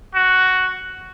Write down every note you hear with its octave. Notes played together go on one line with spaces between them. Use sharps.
F#4